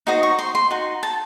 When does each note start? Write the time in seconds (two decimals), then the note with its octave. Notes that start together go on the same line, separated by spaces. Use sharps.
0.07 D#4 F#4 C5 D#5
0.23 C#6
0.39 C6
0.55 C6
0.71 D#4 F#4
1.03 A5